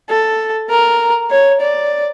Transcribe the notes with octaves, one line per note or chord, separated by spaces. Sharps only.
A4
A#4
C#5
D5